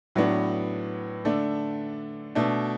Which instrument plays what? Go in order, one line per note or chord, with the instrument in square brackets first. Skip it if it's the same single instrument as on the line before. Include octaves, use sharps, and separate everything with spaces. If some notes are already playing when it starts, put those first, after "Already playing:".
[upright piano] A2 F#3 B3 D4
D3 A3 D4
B2 A3 D4